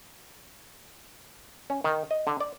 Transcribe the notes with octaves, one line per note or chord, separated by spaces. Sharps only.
C#4
D#3
D#5
D3
D5